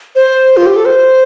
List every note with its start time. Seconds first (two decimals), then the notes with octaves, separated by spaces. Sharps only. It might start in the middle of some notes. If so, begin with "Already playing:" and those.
0.15 C5
0.57 F4
0.66 G4
0.76 A4
0.85 C5